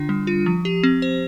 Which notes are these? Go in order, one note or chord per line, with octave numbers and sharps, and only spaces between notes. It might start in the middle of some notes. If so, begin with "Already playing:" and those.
Already playing: D3 D4 F4
G3
F4
F3
G4
C4
C5